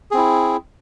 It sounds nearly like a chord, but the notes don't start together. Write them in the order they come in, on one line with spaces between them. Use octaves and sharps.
G#4 C4 E4